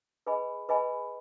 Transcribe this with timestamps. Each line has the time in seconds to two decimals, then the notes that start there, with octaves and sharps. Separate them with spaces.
0.27 G#4 B4 D#5 G#5 B5
0.69 G#4 B4 D#5 G#5 B5